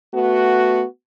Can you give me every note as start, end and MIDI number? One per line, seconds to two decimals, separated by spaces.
0.14 0.84 57
0.14 0.84 59
0.14 0.84 66